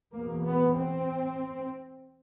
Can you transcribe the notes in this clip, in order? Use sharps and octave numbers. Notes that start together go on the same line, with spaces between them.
E2 B2 A#3
B3
C4